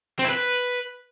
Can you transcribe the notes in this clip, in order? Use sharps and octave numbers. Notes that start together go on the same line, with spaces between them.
C4
E4
B4